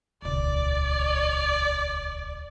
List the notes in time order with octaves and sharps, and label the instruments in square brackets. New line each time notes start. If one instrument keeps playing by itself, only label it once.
[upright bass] D#1 C#2 [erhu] D5